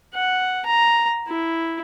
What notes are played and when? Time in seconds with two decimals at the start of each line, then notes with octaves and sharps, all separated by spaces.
0.14 F#5
0.66 A#5
1.28 E4